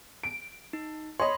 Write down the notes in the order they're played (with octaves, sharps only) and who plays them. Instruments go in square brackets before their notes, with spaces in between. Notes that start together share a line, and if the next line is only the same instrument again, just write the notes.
[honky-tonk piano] D7
[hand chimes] D#4
[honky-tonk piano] C#5 D#5 [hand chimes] B5 C6